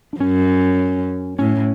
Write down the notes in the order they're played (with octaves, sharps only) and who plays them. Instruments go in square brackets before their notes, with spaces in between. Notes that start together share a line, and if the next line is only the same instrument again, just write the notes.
[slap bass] D4
[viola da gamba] F#2 [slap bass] C#4
[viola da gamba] A2 [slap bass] C#4